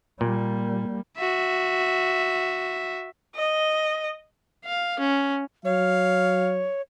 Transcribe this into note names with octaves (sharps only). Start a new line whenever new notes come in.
A#2 G3 A#3
F#4 E5
D#5
F5
C#4
F#3 C#5 F5